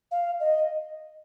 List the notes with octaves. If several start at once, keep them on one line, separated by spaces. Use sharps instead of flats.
F5
D#5